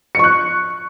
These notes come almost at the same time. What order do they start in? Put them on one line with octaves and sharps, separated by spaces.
C#7 C#6 F#6